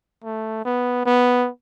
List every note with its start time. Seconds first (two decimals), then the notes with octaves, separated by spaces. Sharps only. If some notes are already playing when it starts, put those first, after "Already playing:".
0.24 A3
0.65 B3
1.05 B3